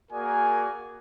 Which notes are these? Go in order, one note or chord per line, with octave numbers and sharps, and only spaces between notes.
A#3 F#4 G#4 A#4 D5 G#5